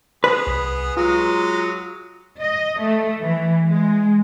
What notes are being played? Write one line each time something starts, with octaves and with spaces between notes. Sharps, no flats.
B3 G#4 B4
C2
F#3 G#3 F4 A#5
D#5
A3
E3
G#3